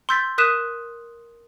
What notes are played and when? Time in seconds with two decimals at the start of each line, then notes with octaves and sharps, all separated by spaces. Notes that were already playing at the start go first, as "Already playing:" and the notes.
0.09 C6 E6 G6 A6 B6
0.38 A#4 D#6 F#6 B6 D#7 E7